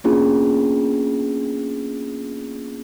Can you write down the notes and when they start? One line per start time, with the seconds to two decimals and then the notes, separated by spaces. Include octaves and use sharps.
0.04 A#3 B3 C#4 D4 F4 G#4